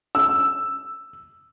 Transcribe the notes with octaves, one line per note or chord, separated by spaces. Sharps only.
E6